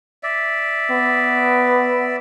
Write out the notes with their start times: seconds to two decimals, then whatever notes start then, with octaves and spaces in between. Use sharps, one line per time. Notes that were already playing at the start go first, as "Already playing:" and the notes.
0.23 D5 E5
0.90 B3